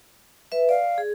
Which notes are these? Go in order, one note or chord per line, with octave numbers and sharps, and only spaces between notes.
B4 E5
D5 F5
G#4